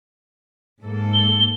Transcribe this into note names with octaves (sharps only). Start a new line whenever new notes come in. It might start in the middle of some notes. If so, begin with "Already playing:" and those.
G#2 A#3 A4
G7